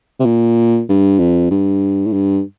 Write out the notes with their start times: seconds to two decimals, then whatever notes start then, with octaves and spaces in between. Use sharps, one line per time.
0.20 C3
0.25 A#2
0.88 G2
1.19 F2
1.51 G2
2.06 A2
2.13 G2